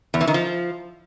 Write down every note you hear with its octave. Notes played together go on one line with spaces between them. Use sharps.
E2
E3
D#3
F3